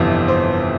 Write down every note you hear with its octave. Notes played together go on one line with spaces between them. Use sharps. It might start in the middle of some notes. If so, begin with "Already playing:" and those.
Already playing: G1 F2 C3 E3
C5